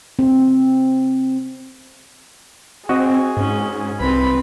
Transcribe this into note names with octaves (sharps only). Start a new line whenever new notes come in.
C4
C4 F#4 G#4 D#5
G#2 C#4
C2 C4 B4 B5